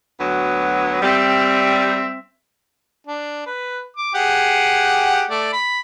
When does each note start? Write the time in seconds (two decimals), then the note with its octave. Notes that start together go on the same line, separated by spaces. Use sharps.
0.20 D2 F#3 B3
1.02 G3 C4 E5
3.07 D4
3.46 B4
3.97 D6
4.14 G4 G#4 F#5
5.30 A3 D5
5.53 B5